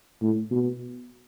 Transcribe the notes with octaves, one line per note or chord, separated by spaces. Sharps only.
A2
B2